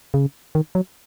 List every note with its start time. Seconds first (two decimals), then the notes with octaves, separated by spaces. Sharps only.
0.14 C#3
0.55 D#3
0.75 F#3